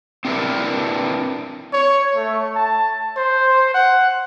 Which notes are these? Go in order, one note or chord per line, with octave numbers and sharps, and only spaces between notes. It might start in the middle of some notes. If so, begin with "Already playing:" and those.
C4 D4 E4 G4 A#4 B4
C#5
A3
A5
C5
F#5